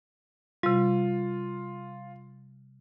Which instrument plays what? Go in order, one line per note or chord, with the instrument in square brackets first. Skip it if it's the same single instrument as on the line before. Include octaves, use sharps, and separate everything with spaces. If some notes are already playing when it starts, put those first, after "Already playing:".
[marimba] C3 G3 [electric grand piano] F4